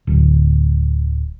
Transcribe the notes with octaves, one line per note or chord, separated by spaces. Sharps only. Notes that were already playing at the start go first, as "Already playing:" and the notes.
D1